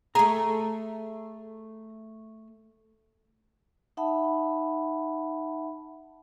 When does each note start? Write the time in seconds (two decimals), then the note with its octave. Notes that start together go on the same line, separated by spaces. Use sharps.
0.15 A3 G#4 A#5
3.97 D#4 E5 F#5 A5 B5